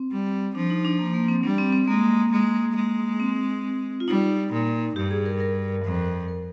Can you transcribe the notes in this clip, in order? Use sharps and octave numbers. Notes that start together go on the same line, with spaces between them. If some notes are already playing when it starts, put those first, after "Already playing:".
Already playing: C4
G3
F3 D4
D#4
D4
A#3
A#3
C4
G3 D4
C4
C4
G#3 A#3
G#3
G#3
C4
F4
G3 D#4
A#2
G2 G4
G#4
A#4
A#4
F2
A#4